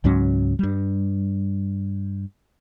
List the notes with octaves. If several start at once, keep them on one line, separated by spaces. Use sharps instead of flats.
C#2 G#2 F#3 C#4
G2 G3